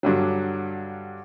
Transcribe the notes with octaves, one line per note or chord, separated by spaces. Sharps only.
G2 D3 F#3